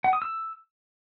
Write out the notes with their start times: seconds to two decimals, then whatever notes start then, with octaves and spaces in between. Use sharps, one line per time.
0.04 F#5
0.13 D#6
0.22 E6